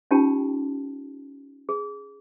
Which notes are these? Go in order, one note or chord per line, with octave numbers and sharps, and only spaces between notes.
C#4 D#4 F4 G4 G5 A5
G#4